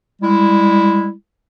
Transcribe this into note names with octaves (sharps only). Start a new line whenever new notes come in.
G3 G#3 E4